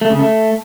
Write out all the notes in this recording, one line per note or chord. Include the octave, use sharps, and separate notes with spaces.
A3
C#3
A3